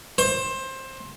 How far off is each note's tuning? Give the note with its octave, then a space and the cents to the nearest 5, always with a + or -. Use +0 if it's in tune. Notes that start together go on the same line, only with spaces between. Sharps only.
C5 +20